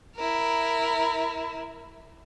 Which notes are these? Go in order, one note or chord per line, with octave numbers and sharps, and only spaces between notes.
E4 A#4